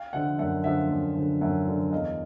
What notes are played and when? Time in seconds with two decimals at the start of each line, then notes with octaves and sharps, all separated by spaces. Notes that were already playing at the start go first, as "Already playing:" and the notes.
Already playing: F5 G5
0.13 D3 F3 E5 F#5
0.38 F#2 E5 F#5
0.64 D3 F3 E5 F#5
0.90 F#2
1.16 D3 F3
1.41 F#2 E5 F#5
1.67 D3 F3
1.91 E2 D#5 F5